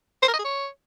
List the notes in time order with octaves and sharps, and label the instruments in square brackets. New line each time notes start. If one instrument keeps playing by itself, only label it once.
[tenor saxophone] C5
A#4
D#5
G#4
C#5